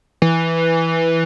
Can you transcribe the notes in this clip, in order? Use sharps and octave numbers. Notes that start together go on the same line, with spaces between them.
E3